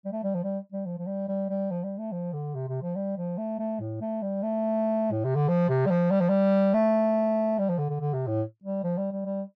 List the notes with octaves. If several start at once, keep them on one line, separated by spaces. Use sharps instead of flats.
G3
A3
G3
F3
G3
G3
F3
F3
G3
G3
G3
F3
G3
A3
F3
D3
C3
C3
F3
G3
F3
A3
A3
A2
A3
G3
A3
A2
C3
D3
F3
C3
G3
F3
G3
F3
G3
A3
G3
F3
D3
D3
D3
C3
A2
G3
F3
G3
G3
G3